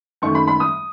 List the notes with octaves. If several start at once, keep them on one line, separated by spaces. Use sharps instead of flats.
F#2 D#3 A3 C#6
B5
B5
D#6